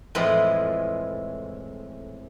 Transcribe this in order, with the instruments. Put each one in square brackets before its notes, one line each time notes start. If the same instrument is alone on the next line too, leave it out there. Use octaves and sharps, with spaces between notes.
[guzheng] F2 A2 E3 G#3 E4 F4